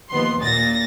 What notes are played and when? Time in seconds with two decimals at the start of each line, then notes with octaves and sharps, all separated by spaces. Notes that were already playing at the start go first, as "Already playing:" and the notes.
0.10 D#2 F3 B3 C6
0.41 A#2 A6 A#6